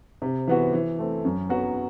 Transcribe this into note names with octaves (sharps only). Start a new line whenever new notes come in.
C3
E3 B3 F#4
E3
A3 C4
F#2
F#3 B3 F#4